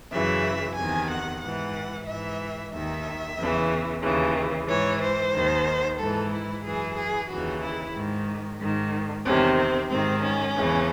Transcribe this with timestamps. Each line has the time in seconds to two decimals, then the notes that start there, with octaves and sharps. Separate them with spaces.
0.12 F#2 C#3 E3 E5
0.77 E2 C3 D#3 G#5
1.10 F#5
1.41 G#2 E3 F#5
2.07 G#2 E3 E5
2.73 D#2 D#3 E5
3.38 E2 C#3 E3
4.03 D#2 C#3 E3
4.68 G#2 E3 C#5
5.01 C5
5.33 D#2 D#3
5.99 G#2 E3 A4
6.31 E4
6.64 F#2 E3 G#4
6.97 G#4
7.29 D#2 C#3 E3 F#4
7.62 E4
7.95 G#2 D#3
8.60 G#2 D#3
9.25 E2 C3 D#3 C#4
9.58 C4
9.90 G#2 D#3 C4
10.23 C#4
10.56 E2 C#3 E3